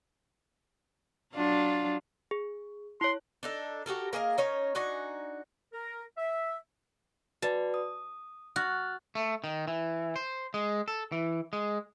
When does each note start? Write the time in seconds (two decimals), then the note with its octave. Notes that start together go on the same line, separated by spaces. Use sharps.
1.34 F#3 D4 F4
2.31 G#4
3.01 E4 C#5 C6
3.43 D4 D#4 A4
3.86 F#4 G4 A4 A#4
4.13 A#3 G#4 A#4 D#5
4.38 C#4 D#4 A#4 C#5
4.75 D4 D#4 F#4 G#5
5.73 A#4
6.18 E5
7.42 F#4 B4 D5 A5
7.74 D#6
8.56 F#4 F6 F#6 A6
9.15 A3
9.44 D#3
9.68 E3
10.16 C5
10.54 G#3
10.88 A4
11.12 E3
11.53 G#3